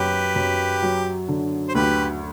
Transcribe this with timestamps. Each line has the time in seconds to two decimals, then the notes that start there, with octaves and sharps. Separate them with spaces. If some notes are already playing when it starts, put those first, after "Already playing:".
Already playing: F#2 F#3 G4 B4
0.36 F#2
0.82 F#3
1.28 D3
1.69 C5
1.74 D2 G4 B4